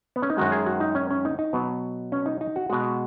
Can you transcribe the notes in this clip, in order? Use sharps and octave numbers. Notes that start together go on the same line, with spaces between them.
B3
C#4
D#4
F#2 D#3 G#3 F#4
G#4
F#4
D#4
C#4
C#4
D#4
D#4
B2 F#3 B3
C#4
D#4
D#4
F#4
B2 G#3 F#4